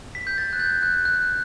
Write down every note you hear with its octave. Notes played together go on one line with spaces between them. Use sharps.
B6
G6
A6
F#6
G6
F#6
F#6